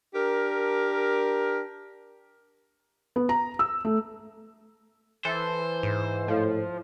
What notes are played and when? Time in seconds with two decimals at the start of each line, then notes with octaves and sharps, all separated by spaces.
0.15 D4 G4 A#4
3.16 B3
3.29 A#5
3.59 E6
3.85 A3
5.25 E3 A4 C5
5.83 G#2
6.28 A2 F3